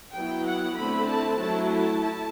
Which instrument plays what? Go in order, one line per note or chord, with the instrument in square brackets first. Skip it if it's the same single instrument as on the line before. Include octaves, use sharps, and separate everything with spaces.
[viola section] F#3 B3 E4 G5
F#5
D3 A3 C4 E4 B5
A5
F#3 A3 E4 A5
A5
E4